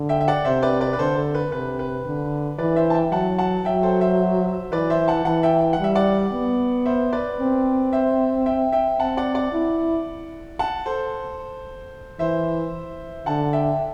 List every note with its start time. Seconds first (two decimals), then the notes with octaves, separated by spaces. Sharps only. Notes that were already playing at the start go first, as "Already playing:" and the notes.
Already playing: D3
0.09 E5 G5
0.21 E5
0.28 D5 F#5
0.45 C3 C5 E5
0.63 B4 D5
0.81 B4 D5
0.93 B4
0.99 D3 A4 C5
1.16 A4
1.35 B4
1.52 C3 B4
1.79 B4
2.06 D3
2.58 E3 B4 D5
2.76 C5 E5
2.90 A5
2.94 E5 G5
3.12 F#3 F#5 A5
3.38 F#5 A5
3.65 F#3 E5 G5
3.83 A4 C5
4.01 C5 E5
4.72 E3 B4 D5
4.90 C5 E5
5.08 F#5 A5
5.25 E3 F#5 A5
5.43 E5 G5
5.61 G5
5.73 F#5
5.79 G3 E5
5.95 D5 F#5
6.33 B3
6.86 C5 E5
7.13 B4 D5
7.39 C4
7.93 C5 E5
8.46 E5 G5
8.72 E5 G5
8.99 C4 F#5 A5
9.17 D5 F#5
9.35 D5 F#5
9.53 E4
10.59 F#5 A5
10.86 A4 C5
12.19 E3 C5 E5
13.26 D3 F#5 A5
13.53 E5 G5